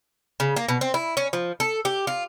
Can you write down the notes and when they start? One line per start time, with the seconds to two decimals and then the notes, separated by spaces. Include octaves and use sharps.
0.40 C#3
0.56 A#3
0.69 B2
0.81 C4
0.94 E4
1.17 C#4
1.33 F3
1.60 A4
1.85 G4
2.07 F4